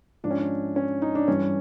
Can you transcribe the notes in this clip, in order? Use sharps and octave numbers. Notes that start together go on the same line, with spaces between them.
G#2 F3 D4
C#4
D4
C#4
D#4
D4
G2 E3 G3 C#4